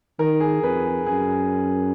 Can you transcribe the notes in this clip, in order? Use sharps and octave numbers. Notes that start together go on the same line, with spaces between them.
D#3 A#4
G#4
F2 B4
G#4
F#2 G#4